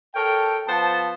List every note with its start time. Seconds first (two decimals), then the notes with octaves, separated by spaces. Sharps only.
0.15 A4 A#4 C#5 G5
0.68 F3 B3 C5 A5